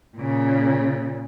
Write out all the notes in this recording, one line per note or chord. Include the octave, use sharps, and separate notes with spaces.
A#2 C#3